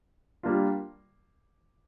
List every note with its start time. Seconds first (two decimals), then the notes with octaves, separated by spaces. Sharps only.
0.43 G3 A#3 D4 F4